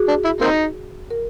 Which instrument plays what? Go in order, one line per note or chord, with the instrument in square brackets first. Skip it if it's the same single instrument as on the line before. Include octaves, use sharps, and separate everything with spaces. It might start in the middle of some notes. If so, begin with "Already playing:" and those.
Already playing: [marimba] F#4 G#4
[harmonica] D4
E4
A#3 C4 D#4
[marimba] A#4